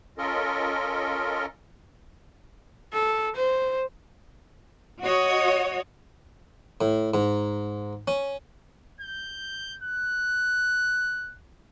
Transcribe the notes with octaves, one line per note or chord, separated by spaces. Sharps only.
C#4 F4 A4 A#4 D#5
A4
C5
F#4 C#5 D#5
A2
G#2
C#4
G6
F#6